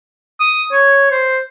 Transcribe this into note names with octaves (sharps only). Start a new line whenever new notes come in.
D#6
C#5
C5